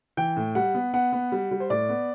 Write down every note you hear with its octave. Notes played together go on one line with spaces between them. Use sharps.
E3 G5
A2
G3 F#5
B3
B3 F#5
B3
G3
G3
C5
A2 D5
B3